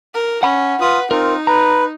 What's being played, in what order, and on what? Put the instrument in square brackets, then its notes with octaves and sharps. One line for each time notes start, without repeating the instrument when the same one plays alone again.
[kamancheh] A#4
[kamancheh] C#4 [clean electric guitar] F#5 B5
[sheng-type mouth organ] F4 D#6 [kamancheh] B4
[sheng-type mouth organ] C4 F4 [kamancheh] D#4 [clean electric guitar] A#4
[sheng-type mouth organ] B4 [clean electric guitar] A#5